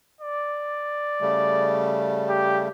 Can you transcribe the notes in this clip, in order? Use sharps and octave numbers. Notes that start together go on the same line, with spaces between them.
D5
C#3 G3 A3
G4